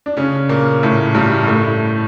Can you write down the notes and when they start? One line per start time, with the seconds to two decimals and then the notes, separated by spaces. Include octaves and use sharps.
0.06 D4
0.17 C#3 C#4
0.49 A#2 A#3
0.83 A2 A3
1.15 G2 G3
1.47 A2 A3